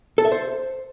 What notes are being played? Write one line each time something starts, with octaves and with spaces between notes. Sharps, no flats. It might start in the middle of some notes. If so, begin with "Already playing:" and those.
A4
E5
C5